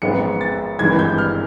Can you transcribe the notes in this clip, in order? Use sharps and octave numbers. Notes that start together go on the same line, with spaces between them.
A1 G#2 F3 G#3 B3 C#7
A6
G#1 G2 E3 G#3 G#6
G6
F6